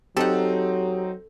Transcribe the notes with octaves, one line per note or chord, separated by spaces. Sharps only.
F#3 C4 D#4 G4 A4 F#5